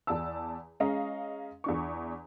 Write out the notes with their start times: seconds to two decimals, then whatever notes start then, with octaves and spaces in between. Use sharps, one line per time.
0.07 E2 D5 A5 E6
0.80 G#3 C#4 D#5 F5 A#5
1.64 E2 D4 C#6